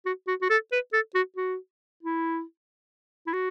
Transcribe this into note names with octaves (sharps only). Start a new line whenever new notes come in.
F#4
F#4
F#4
A4
B4
A4
F#4
F#4
E4
E4
F#4